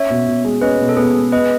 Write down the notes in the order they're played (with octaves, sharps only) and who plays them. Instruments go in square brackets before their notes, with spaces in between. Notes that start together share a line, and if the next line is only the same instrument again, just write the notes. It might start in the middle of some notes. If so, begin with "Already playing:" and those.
Already playing: [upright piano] C#4 [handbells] C#5 E5
[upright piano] B2
B2
G#3
[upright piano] C#4 [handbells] B4 D#5
[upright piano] B2
[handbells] A4
[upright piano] B2 [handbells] G#4 B4
[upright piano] G#3
[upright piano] B3 [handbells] B4 D#5